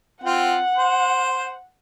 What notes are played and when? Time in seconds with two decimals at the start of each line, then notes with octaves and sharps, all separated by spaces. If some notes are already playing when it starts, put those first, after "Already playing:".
0.24 C4 F4 F#5
0.77 C5